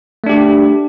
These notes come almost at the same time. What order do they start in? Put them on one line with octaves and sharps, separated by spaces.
A3 D4 G4